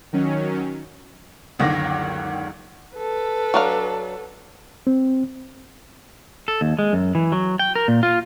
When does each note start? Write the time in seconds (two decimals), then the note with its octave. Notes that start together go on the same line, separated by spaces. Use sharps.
0.13 D#3 F#3 C#4
1.59 F#1 C#2 D3 D#3 D6 A#6
2.97 A4 B4
3.54 F#3 D4 F5
4.87 C4
6.48 A4
6.61 D#2
6.79 G#3
6.93 F#2
7.15 E3
7.32 F#3
7.59 G5
7.75 A#4
7.88 A#2
8.03 F4